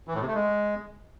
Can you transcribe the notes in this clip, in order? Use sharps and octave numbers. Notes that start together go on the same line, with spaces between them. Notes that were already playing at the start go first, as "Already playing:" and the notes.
E3
A2
C3
A3
G#3